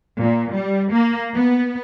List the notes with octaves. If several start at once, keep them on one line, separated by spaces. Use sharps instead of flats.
A#2
G3
A#3
B3